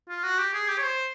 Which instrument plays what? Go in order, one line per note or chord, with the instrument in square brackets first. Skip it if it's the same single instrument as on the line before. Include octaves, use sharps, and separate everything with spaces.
[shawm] F4
F#4
G4
G#4
G4
C#5
C5